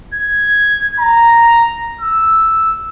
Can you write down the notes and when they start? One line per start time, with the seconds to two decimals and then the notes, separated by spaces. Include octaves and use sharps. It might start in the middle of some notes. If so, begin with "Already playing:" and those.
0.14 G#6
1.00 A#5
2.01 E6